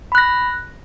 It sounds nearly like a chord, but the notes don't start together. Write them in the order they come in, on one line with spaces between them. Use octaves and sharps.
B5 F#6 A#6